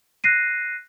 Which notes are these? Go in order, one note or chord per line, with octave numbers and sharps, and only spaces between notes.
F#6 A#6 C7 D#7